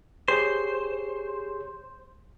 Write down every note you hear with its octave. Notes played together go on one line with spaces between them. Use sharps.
G4 G#4 C5 C#5